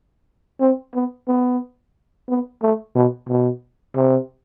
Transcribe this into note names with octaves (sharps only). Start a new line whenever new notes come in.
C4
B3
B3
B3
A3
B2
B2
C3